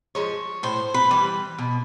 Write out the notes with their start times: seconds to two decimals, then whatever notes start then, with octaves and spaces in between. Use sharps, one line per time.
0.15 F3 G#3 C#5
0.63 A2 C5
0.94 B4
1.11 E3 G3
1.58 B2